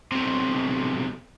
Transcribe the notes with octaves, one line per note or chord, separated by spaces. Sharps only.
B1 C3